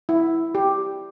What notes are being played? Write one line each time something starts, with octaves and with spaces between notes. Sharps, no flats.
E4
G4